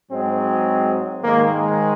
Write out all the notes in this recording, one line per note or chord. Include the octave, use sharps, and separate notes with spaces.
G#2 F#3 G#3 C4
G#2 D#3 G#3 A#3
G#3